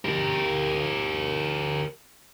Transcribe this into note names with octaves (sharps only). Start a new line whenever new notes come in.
G4 A#4